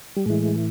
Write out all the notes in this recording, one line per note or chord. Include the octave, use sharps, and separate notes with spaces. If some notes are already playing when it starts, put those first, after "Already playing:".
G3
A2 E3 G#3